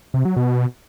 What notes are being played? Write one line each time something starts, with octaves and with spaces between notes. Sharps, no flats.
C3
F#3
B2